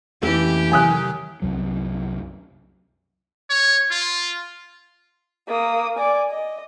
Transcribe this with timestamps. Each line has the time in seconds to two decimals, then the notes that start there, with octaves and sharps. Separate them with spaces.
0.23 F2 E3 A3 A#3 C#4 G4
0.72 C3 D#3 F#3 G#5 D#6 F#6
1.42 C2 F#2 F#3
3.49 C#5
3.91 F4
5.48 A#3 D#6
5.96 D5 G#5
6.30 D#5